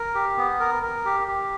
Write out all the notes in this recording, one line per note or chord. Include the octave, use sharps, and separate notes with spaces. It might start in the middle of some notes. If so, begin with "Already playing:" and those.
Already playing: A#4
G4
B3
A#4
A#4
G4
G4